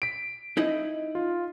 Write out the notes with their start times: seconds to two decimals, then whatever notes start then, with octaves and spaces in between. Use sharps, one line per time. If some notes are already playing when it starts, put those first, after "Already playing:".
0.02 B6 D7
0.57 D#4 E4 D#5
1.15 F4